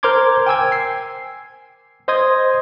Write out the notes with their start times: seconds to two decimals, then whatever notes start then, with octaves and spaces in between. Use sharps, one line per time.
0.03 A#4 C5 A#5 C6 D6 G#6
0.46 G5 G#5 E6 G#6
0.72 C7
2.08 C5 D#5 C6 D#6 G#6